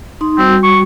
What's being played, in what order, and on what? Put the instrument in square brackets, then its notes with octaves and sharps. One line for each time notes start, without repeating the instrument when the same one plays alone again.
[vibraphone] D#4 C6
[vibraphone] G3 F#4 [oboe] C4
[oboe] C#6